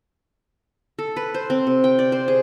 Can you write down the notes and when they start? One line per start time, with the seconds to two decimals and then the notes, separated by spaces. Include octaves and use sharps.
0.99 A4
1.16 B4
1.34 C5
1.50 C4
1.67 C3
1.84 G5
1.99 D5
2.12 C5
2.28 G#4